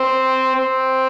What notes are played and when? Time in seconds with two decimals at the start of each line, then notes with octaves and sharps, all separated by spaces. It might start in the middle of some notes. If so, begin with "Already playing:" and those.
Already playing: C4
0.56 C4